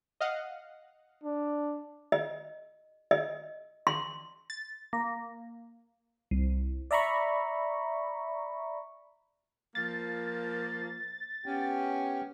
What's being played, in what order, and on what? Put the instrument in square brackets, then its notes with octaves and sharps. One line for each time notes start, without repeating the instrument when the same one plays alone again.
[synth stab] D#5 F5 F#5
[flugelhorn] D4
[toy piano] D#5
D#5
C6
[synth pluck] A6
A#3
C2
[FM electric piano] D5 E5 A#5 B5 C#6
[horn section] F3 A#3 [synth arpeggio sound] A6
[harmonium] B3 G4 G5 [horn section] C#4